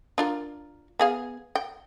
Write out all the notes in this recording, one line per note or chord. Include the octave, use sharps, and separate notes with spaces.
D4 F4 A#4
B3 G#4 F5
G5